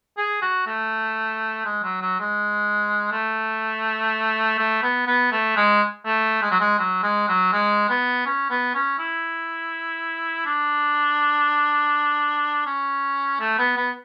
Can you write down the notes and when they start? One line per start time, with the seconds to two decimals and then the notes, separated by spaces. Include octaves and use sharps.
0.18 G#4
0.42 F#4
0.67 A3
1.65 G#3
1.83 F#3
2.02 F#3
2.20 G#3
3.12 A3
4.59 A3
4.83 B3
5.07 B3
5.32 A3
5.56 G#3
6.06 A3
6.42 G#3
6.51 F#3
6.60 G#3
6.79 F#3
7.03 G#3
7.29 F#3
7.53 G#3
7.90 B3
8.26 C#4
8.50 B3
8.75 C#4
8.99 E4
10.46 D4
12.66 C#4
13.41 A3
13.59 B3
13.77 B3